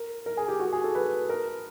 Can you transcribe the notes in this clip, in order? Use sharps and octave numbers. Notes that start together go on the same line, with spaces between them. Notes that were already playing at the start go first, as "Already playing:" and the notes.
Already playing: A#4
A#4
G#4
G4
F#4
G#4
A4
B4
A#4